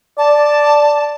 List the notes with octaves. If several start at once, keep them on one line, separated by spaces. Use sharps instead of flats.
D5 A5